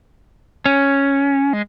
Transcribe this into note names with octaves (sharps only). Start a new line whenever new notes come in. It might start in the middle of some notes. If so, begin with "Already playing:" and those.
C#4
G#3